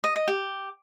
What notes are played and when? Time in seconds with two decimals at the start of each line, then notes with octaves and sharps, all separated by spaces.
0.04 D#5
0.16 D#5
0.28 G4